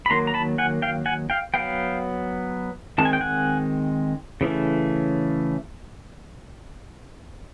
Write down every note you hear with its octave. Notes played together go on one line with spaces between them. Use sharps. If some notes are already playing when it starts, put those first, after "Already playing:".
B5
D#3 F#3 A#3 A#5 C6
A#5
A5 B5
F#5 G#5
F5 G5
F#5 G#5
F5 G5
F#3 B3 F5 G5
D#3 G#3 C4 A5
G#5
G5
F#5 G#5
C#3 E3 A3 C#4